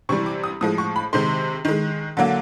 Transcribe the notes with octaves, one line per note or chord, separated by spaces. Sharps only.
C3 E3 G3 C#6
D6
D#6
A2 F3 G#3 D#6
C#6
B5
C3 D#3 G#3 C6
D#3 G#3
D3 F#3 A#3